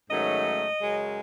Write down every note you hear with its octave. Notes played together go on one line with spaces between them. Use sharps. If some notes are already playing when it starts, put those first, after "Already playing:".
G#2 D#3 F#3 A3 C#4 D#5
F#2 C#3 G#3